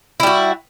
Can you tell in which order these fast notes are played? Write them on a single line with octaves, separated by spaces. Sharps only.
E4 G3 F#4